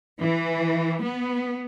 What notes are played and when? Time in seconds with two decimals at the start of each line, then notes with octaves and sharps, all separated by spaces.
0.21 E3
1.04 B3